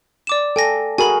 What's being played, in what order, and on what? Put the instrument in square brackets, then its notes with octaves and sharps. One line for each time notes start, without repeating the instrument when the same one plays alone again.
[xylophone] D5 D6 E7
[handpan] A4 [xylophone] G5 G#5 A#6
[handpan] F#4 G#4 A#4 [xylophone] G#5 B5